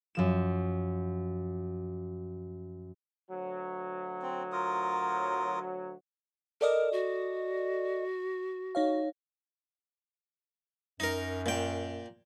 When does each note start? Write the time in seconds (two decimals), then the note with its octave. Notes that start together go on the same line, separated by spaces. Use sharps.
0.15 F#2 F3 E7
3.29 D2 F#3
4.22 C4
4.52 F4 A#4 D#6
6.61 A4 A#4 D5 D#5
6.93 F#4
8.75 D#4 C#5 F5
11.00 F#2 D#4 A#4
11.46 A#2 G5